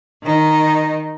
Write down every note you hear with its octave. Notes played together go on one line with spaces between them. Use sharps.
D#3 D#4